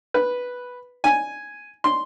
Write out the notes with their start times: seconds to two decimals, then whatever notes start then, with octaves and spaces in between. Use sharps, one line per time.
0.14 B4
1.04 G#5
1.84 C6